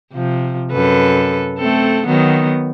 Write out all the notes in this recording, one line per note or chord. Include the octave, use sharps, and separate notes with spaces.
C3 F3
F#2 A4 B4
A3 C4 A4
D#3 F#3 B3